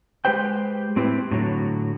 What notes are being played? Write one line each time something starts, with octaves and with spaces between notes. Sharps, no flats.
G#3 G4 B4 C5 G5
A2 C4 E4 G4 B4
A2 D3 F#3